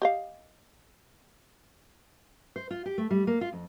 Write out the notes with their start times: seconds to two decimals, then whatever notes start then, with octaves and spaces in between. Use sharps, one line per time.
0.02 G4 D#5 F5
2.56 C5
2.71 F4
2.86 G4
2.98 A3
3.11 G3
3.27 A#3
3.41 F4
3.53 F2